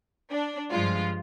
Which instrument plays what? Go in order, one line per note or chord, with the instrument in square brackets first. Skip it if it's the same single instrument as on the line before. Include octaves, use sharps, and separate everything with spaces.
[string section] D4
G2 F3 G#3 F4